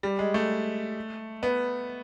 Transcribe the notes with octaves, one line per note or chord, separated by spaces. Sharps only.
G3
G#3
A3
B3